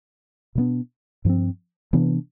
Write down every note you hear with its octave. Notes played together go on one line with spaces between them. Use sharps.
B2 G3 B3 D4
G2 F3 C4
C3 E3 B3 D4